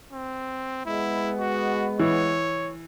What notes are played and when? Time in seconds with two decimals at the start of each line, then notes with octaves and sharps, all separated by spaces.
0.12 C4
0.86 G#3 B3 E4
1.39 F#4
2.00 E3 C#5